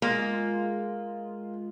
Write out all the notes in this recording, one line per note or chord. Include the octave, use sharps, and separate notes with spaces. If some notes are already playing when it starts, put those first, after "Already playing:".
G#3 A#3 F4